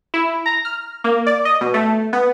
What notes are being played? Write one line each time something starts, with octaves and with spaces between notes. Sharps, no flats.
E4
A#5
F6
A#3
D5
D#5
B2
A3
B3